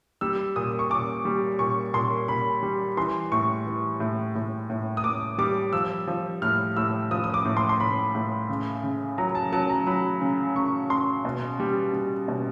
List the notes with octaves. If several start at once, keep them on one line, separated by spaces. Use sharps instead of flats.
G3 E6
A#2 D#6
C#6
A#2 D6
G3
A#2 C#6
A#2 C6
A#2 B5
G3
E3 C6
A2 C#6
E3
A2
A2
A2
D#6
A2 D6
G3 D6
F3 E6
F3
A2 F6
A2 E6
F3 D#6
D#6
D6
A2
C6
C6
A2 B5
A2
C#3
C#3
F#3 A#5
A5
F#3 A5
A#5
F#3 B5
C#3
C#3 C#6
C#3 C6
B2
G3
G3
B2